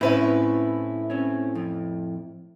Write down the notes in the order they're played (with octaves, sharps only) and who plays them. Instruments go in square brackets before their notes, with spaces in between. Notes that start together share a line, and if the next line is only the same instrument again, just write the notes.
[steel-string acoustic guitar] A2 B4 E5 [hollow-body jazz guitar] C4 C#4 E4
[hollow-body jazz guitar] C4 C#4
F2